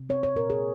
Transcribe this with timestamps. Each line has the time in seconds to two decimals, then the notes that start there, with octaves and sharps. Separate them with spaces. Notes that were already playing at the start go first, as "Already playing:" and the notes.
Already playing: C3
0.09 C4 C#5
0.23 C#5
0.36 A#2 A#4
0.50 G#4